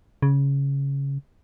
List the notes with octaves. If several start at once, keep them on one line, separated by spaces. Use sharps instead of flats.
C#3